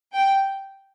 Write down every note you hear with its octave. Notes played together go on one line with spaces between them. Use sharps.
G5